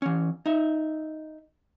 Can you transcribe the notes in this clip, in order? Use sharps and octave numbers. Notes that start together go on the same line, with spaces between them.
E3 C#4
D#4 E5